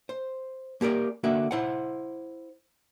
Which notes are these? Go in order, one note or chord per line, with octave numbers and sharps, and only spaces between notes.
C5
A#3 G4 A#4 D5
D3 A#3 F#4 E5
E4 C5 F#5